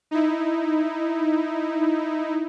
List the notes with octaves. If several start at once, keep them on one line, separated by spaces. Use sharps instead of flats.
D#4 E4